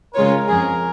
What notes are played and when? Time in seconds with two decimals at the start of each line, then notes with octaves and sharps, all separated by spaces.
0.14 C#3 G#3 F4 A#4 C#5
0.47 F2 F3 C#4 G#4